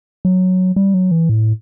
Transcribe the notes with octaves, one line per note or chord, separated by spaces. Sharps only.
F#3
G3
F#3
E3
A2